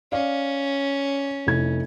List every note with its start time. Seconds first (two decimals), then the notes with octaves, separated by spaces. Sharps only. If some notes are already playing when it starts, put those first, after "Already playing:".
0.12 C#4 D5 F5
1.47 F1 E4 G#6